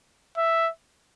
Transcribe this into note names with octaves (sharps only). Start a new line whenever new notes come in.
E5